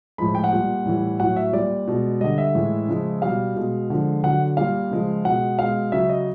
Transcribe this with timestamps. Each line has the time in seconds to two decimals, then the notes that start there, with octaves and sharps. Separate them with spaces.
0.18 A2 F3 G#3 B5
0.35 G5
0.44 F#5
0.52 A#2 G3
0.85 A2 E3 G3
1.20 A2 F#3 F#5
1.36 E5
1.53 A#2 G3 D5
1.87 B2 G#3
2.21 D3 G3 D#5
2.38 E5
2.55 A2 E3 G#3
2.88 C#3 F3 G#3
3.22 B2 G3 F5
3.56 B2 G#3
3.90 D3 F3 G#3
4.23 D3 F#3 F#5
4.57 A#2 G3 F5
4.91 C#3 F3 G#3
5.25 B2 G#3 F#5
5.59 B2 G#3 F5
5.92 C#3 F#3 E5
6.09 D#5